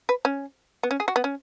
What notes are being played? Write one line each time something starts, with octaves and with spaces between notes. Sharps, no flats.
B4
C#4
B3
C#4
G#4
F#4
B3
C#4